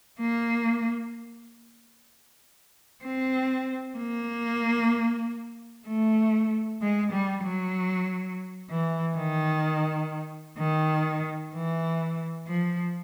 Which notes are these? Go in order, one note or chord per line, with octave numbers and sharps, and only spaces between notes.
A#3
C4
A#3
A3
G#3
G3
F#3
E3
D#3
D#3
E3
F3